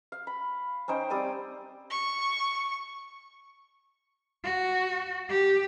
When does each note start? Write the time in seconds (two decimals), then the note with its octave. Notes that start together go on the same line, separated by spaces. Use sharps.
0.12 F5
0.27 B5
0.88 C#4 D#4 C5 G5
1.10 G3 C4 D5 D#6
1.90 C#6
4.44 F#4
5.29 G4